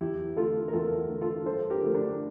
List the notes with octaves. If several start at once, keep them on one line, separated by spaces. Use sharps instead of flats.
E2 E4 G4
D3 A3 F4 A4
A#4
E2 F4 A4
D3 A3
F4 A4
G2 A4 C5
G4 A#4
D3 F3 A3
D4